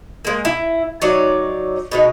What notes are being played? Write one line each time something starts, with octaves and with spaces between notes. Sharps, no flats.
G#3 A#3
E4
F#3 D#4 C#5 D5
B2 G#3 D#4